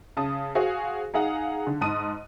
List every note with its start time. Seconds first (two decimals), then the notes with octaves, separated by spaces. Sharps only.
0.17 C#3 A5 D#6
0.55 F#4 G#4 C5 F5
1.14 D#4 G#4 F5 F#5
1.67 D3
1.81 G#2 A5 D#6 D#7